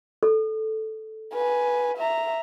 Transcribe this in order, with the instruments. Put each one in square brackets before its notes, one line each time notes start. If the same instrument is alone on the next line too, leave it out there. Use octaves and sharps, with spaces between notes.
[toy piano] A4
[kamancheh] B4 G#5
E5 A#5